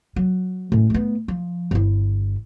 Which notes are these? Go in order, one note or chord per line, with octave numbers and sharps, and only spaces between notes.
F#3
A2 C#4
A3 B3
F3
G1 E4